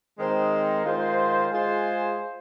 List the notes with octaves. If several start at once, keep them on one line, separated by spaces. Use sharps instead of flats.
D#3 G#3 C4 D#4 C5
D#3 G#3 F4 C5
G#3 F4 G#4 C5